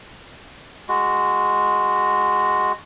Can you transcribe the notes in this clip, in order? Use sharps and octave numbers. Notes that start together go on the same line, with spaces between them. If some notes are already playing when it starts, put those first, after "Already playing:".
G#3 F#4